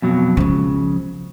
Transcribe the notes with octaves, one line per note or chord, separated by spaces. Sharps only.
F2 B2 F#3
C#3 F3 G#3